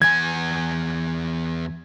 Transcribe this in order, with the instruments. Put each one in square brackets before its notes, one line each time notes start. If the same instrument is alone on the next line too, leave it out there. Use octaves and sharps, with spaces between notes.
[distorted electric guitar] E2 G#5 [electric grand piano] G#6